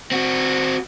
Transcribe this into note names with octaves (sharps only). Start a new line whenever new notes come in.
C4 F#4